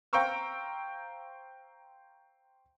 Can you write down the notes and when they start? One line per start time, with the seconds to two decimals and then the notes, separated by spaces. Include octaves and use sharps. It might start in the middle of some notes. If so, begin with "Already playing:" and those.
0.13 C5 F5 G5 A#5 C#6 E6